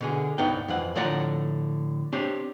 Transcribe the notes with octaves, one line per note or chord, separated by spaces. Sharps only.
B2 D3 G#4
C2 G2 B3 D#4 G5
F2 E3 F#5
A2 D3 F3 D5 F#5 A#5
C4 D4 G4 C#5